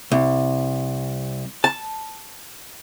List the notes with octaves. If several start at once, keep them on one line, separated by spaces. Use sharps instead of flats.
C2
A5